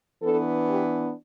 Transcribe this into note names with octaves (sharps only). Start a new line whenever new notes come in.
E3 B3 D4 A4
G4